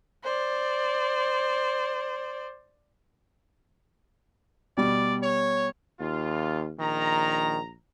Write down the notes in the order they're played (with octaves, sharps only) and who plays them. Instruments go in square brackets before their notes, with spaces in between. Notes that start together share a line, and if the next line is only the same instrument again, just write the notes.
[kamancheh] C5 D5
[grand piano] B2 G3 [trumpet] D5
[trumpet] C#5
[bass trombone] D#2 [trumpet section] F4
[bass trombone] A#1 [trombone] D#3 [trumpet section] A#5